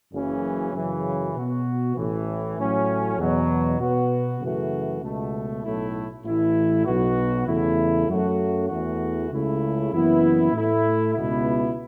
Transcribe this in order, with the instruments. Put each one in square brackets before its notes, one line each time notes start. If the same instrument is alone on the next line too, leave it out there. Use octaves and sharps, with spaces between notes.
[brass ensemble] F#1 F#2 C#3 E3 C#4
F#2 C#3 E3
B2 B3 F#4
A1 A2 E3
A1 A2 F#3 C#4
E2 B2 F#3
B2 B3 F#4
F#2 C#3 E3 A3 F#4
C#2 B2 A3
B1 A2 A3 E4
A1 A2 E3 A3 E4
B1 B2 B3 F#4
E2 C#3 A3 E4
F#2 F#3 A3 F#4
E2 E3 A3 F#4
C#2 C#3 A3 E4
F#1 F#2 E3 B3 E4
A2 A3 E4
C#2 B2 B3 E4